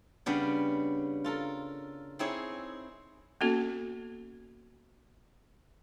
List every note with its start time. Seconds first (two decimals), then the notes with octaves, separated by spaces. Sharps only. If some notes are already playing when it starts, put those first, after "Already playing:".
0.26 C#3 G3 B3 D4
1.24 F4 A4 A#4
2.19 C4 D#4 E4 G#4 C#5
3.41 A#3 B3 C#4 F#4 A4